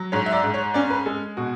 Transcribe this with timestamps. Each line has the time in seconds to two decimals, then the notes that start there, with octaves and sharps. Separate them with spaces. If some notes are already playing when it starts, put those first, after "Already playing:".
Already playing: F#3
0.12 G#2 C#5
0.26 E5
0.32 D5
0.44 G#2
0.54 C#5
0.74 C#4 D5
0.90 B4
1.06 G#3 A4
1.37 B2 F#4